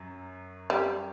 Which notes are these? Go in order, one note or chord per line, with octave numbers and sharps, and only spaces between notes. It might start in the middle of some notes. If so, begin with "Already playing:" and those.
Already playing: F#2 F#3
G3